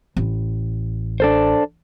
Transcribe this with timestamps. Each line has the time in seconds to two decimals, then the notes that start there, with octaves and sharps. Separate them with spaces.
0.17 A1
1.20 D4 A4 C5